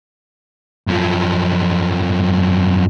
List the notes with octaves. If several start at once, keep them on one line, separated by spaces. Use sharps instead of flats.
F#2 F3